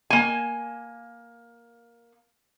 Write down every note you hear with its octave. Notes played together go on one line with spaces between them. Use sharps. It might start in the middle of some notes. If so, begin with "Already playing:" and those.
A#3 G#5